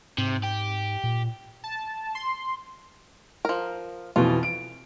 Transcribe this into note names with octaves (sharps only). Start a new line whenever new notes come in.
G#2 C3
G4
A#2
A5
C6
F3 A#4
F2 B2 E3 F4
D7